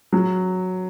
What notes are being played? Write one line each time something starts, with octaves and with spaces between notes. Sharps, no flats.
F#3